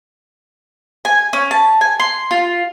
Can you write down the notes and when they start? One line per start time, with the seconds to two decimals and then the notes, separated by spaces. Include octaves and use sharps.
1.05 G#5
1.33 C#4
1.51 A5
1.81 G#5
2.00 C6
2.31 F4